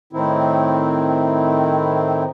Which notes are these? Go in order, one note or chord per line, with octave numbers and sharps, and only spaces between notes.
A2 D#3 C4 E4